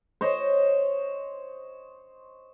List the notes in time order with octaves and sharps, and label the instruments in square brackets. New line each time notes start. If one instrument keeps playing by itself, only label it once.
[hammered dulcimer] C5 C#5 D#5